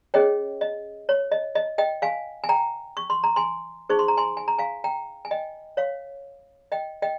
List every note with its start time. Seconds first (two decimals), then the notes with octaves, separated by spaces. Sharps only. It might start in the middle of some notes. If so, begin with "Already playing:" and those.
0.14 C#4 G#4 C#5 D#5 G5
0.61 D#5
1.09 C#5
1.32 D#5
1.55 D#5
1.78 D#5 G5
2.02 F5 G#5
2.44 G#5
2.49 G5 A#5
2.97 C#6
3.10 C6
3.24 A#5
3.36 G#5 C6
3.89 D#4 G#4 C5 C#6
3.99 C6
4.08 A#5
4.17 G#5 C6
4.37 G#5
4.48 A#5
4.58 F5 G#5
4.84 G5 A#5
5.25 G#5
5.31 D#5 G5
5.77 C#5 F5
6.72 D#5 G5
7.02 D#5 G5